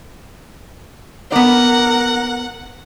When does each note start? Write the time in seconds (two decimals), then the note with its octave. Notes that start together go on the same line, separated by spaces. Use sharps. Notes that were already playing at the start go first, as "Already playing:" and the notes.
1.32 B3 A#4 D5 F#5